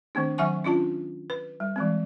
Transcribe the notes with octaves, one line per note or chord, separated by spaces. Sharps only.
D#3 A3 C4 D4
D#3 F#3 E5 F#5 G#5 C#6
C#4 D4 F4 A5
B4
G3
E3 G#3 C4